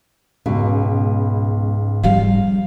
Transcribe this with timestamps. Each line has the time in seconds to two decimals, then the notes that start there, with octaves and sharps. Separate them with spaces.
0.46 C#2 G#2 B2
2.03 F3 G3 F5